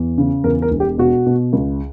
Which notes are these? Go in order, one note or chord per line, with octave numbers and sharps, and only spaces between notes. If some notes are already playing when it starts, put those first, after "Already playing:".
Already playing: E2
C#3
E2 A#4
A#4
E1
G4
B2 F#4
B2
C#2